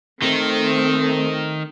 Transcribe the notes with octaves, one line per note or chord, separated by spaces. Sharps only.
D#3 A3 C4 D#4